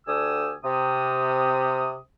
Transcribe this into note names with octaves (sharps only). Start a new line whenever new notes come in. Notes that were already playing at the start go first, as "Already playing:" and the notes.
D2 D3 G4 G#5 D#6 E6
C3 D#6